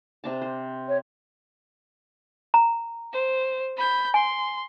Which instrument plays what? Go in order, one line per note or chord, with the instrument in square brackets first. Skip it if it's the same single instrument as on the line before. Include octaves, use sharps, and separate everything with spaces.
[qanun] C3 D4 A5
C5
[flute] C#5
[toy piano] A#5
[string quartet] C5
B5 G6
[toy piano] G#5 [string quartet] C6